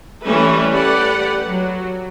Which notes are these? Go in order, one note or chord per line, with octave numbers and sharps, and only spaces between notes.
E3 G3 A3 C#4 B4 E5
G4 A4 B4 D5 F#5
F#3